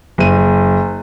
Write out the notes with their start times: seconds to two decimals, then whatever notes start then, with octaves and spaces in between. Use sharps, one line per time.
0.18 F#1 D#7